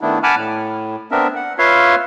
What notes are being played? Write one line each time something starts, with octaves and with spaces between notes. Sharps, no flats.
D#3 A3 B3 D4 E4
F#5 G#5 A5 B5 D6 F6
A2
B3 C4 D4 A#4 E5
F#5
F4 B4 C#5 E5 F5 C6